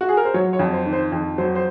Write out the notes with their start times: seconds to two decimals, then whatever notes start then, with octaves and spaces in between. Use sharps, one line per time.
0.01 F#4
0.09 G#4
0.17 A#4
0.25 C5
0.34 F#3 C#5
0.53 C#5
0.59 F2
0.73 C5
0.86 D#3
0.93 C5
1.12 F2
1.38 F#3 C5
1.55 C5